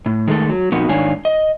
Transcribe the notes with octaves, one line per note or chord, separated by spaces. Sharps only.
A2
D#3 G#3 A3 A4
F#3
A#2 F3 B3 C4 D#4 F#4
G#2 D#3 D4 C#5 F5 G#5
D#5